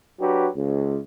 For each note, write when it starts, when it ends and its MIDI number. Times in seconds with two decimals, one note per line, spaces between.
0.20 0.46 54
0.20 0.46 62
0.20 0.46 66
0.20 0.46 67
0.20 0.46 71
0.55 0.98 37